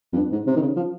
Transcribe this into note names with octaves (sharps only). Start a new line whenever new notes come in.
F2
G2
G#2
C3
D#3
C#3
F3